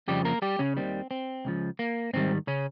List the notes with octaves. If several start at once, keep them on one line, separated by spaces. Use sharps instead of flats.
F2 C#3 F3 G3 G4
A#3 A#4
G3 G4
C#3 C#4
D#2 D#3 G3 C4
C4
C#2 C#3 F3
A#3
G#2 D#3 G3 C4
C#3 C#4